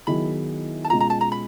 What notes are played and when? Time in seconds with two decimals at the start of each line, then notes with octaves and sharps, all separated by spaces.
0.07 D#3 F#3 B3 E4 G#4 B5
0.85 A5
0.90 B2 G#3 C#4 F4 A#5
1.00 A#5
1.10 A5
1.21 A#5
1.32 B5